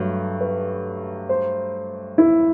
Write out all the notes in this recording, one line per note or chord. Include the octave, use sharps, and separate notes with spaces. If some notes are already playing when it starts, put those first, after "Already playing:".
Already playing: G2 F#3 A3 B4
B4
C5
E4